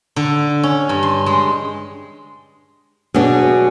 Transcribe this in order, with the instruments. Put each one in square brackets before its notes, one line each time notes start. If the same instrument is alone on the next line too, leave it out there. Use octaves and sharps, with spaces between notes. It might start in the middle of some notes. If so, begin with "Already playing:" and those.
[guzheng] D3
C#4
G2
C6
G#3
[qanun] B2 F#3 [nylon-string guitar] D4 G#4